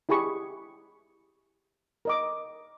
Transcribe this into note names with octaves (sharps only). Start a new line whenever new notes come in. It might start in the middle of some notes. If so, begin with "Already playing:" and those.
E4 G4 G#4 B5 C#6
A#4 D#5 D6